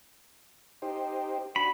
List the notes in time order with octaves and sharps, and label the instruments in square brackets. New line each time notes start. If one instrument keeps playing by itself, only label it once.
[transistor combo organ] D#4 G4 C5
[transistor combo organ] D4 F#4 [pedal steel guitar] B5